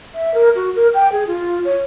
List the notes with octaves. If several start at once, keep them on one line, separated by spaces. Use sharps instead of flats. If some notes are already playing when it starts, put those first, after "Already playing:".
E5
A#4
F#4
A#4
G5
G#4
F4
C#5